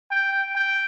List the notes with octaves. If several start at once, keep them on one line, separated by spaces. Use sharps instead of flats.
G5
G5